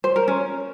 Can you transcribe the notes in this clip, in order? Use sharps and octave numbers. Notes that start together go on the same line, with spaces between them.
C5
A#4
C#4